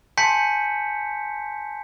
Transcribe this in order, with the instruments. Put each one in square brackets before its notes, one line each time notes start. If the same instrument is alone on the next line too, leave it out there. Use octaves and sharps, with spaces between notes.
[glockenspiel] G#5 A5 C6 G6 B6 C#7